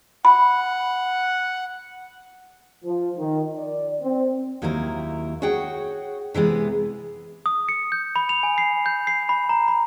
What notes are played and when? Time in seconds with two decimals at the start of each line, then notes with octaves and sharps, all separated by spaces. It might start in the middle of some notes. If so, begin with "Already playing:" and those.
0.25 F#5 B5
2.84 F3
3.17 D#3
3.56 D5
4.01 C4
4.62 D#2 D#3 F#3 A#3 E4 A#4
5.42 F#4 G#4 C#5 F#5 G5
6.34 C3 E3 G#3 B3
7.46 D#6
7.69 C#7
7.92 G6
8.16 B5
8.29 F7
8.43 G#5
8.58 C7
8.86 G6
9.07 C7
9.29 B5
9.49 A#5
9.68 B5